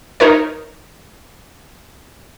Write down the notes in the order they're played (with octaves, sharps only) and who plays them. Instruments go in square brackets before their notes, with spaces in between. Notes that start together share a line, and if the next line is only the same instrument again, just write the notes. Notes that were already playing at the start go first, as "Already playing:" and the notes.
[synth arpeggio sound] D#4 A#4 C#5